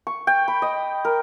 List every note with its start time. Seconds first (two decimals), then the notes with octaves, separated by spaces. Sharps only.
0.07 C#6
0.27 G5
0.48 B5
0.62 D#5
1.05 A#4